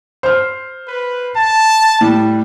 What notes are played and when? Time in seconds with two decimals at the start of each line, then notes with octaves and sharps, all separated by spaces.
0.23 C5 F6
0.87 B4
1.36 A5
2.01 A2 G3